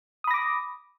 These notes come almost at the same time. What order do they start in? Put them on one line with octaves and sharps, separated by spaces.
D#6 B5 A#6 D6